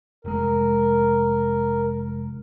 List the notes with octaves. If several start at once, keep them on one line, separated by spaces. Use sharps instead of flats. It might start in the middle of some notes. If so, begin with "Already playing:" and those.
F1 G#3 A#4